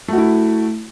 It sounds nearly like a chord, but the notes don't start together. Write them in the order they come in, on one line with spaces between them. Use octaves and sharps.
A3 F#4 E4